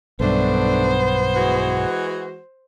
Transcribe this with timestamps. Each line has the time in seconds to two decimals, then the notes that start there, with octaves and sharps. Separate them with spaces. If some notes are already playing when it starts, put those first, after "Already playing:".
0.20 B1 G2 A3 B3 D4 C5
1.34 E3 G#3 F#4